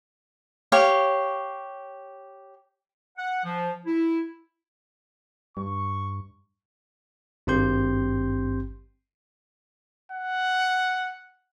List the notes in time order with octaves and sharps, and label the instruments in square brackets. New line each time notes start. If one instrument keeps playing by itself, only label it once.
[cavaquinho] G4 C#5 F5
[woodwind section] F#5
F3
E4
[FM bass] G2 [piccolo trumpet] C#6
[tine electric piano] G#1 G2 C4 G4 C6 G6
[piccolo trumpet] F#5